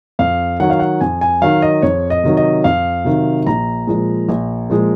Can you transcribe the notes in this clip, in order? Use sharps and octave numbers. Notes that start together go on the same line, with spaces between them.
F2 F5
D#3 F#3 F#5
F5
F#5
F2 G#5
G#5
D#3 F#3 F5
D#5
F2 C#5
D#5
C3 D#3 F#3
D#5
F2 F5
C3 D#3 F#3
A#1 A#5
A#2 F3 G#3
A#1
A#2 F3 G#3